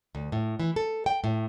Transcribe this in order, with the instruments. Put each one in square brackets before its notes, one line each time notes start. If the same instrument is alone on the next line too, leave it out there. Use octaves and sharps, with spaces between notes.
[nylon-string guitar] D2
A2
E3
A4
G5
A2